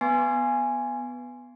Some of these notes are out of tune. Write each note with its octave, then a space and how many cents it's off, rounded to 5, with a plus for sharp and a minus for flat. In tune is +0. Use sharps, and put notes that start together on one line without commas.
B3 +0 G#5 +0 C6 +0